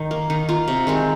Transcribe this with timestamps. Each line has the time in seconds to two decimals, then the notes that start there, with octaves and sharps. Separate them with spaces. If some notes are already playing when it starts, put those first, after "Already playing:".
Already playing: D#3 D#4
0.11 A#3
0.30 D#3 D#4
0.49 A#3 F4
0.68 C3
0.87 D#3 G#3 C4